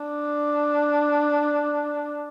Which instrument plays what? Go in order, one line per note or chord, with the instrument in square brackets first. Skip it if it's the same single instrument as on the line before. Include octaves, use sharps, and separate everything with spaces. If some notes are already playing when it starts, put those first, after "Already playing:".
Already playing: [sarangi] D4